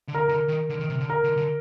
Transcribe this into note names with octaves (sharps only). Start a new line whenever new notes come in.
D3
A#4
D3 A#4
D#3
D3
D#3
C3
D3
A#4
D3
D3